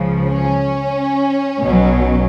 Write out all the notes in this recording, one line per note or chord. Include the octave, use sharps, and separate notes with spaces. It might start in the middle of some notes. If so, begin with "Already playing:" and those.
Already playing: C#2 C#3 F3
C#4
B1 B2 F#3